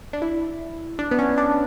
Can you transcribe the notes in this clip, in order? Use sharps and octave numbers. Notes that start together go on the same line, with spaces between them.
D4
E4
D4
B3
C#4
D4